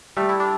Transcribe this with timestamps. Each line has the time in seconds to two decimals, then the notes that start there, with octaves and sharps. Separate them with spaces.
0.17 G3 A3
0.29 E4
0.40 D4